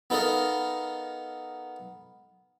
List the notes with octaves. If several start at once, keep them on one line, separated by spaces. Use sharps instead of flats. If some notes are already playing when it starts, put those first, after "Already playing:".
B3 D#4 A4 A#4 D#5 F5